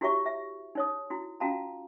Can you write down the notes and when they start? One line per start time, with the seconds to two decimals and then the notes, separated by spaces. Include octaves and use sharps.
0.01 E4 F#4 G4 C#5 E5 C#6
0.26 E5
0.75 D#4 C#5 D#6
1.10 E4 F#4
1.40 C#4 F4 F#4 F5 A5 A#5